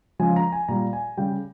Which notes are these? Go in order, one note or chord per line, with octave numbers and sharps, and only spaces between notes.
C#3 F3 G#3 G#5
A#5
G#5
A#2 G3 A#5
G#5
C#3 G3 G5